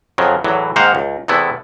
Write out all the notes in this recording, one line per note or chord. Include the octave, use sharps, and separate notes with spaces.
F2 C#3 F3 F#3
E2 A2 E3 F#3
G#2 D#3 A#3 C5 F5 F#5
C#2
E2 C3 A3 B3 E4